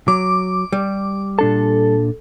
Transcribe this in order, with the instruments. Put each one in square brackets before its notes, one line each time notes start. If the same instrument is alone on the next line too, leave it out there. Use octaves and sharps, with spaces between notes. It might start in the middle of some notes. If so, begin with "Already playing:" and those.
[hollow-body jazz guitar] F#3 [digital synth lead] D6
[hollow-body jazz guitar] G3
[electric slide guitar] A#2 D4 A5 [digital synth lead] A4